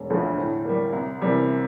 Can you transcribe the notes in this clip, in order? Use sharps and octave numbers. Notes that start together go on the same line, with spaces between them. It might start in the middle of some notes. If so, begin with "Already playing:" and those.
Already playing: E1
D2 D3 F3 A3
A2
G3 A#3
C2
C3 E3 G3 A#3